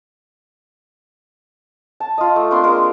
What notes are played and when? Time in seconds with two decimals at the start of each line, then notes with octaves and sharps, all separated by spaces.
2.00 A5
2.18 F4 D#5
2.36 A3
2.51 A#3 C4 D4 C6
2.64 G#3 A#3 A#4